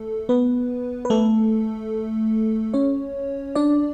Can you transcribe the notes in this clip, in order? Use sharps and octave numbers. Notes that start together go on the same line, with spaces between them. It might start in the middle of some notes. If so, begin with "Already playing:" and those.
Already playing: A3 A4
B3 B4
B4
A3 A4
C#4 C#5
D4 D5